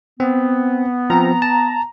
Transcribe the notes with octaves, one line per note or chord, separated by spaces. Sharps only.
B3 C4
F3 C4 A#5
A5